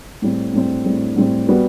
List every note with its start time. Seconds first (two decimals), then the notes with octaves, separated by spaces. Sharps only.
0.22 A2 G3 C4
0.53 A2 G3 C4
0.85 A2 G3 C4
1.16 A2 G3 C4
1.47 G3 B3 F#4 B4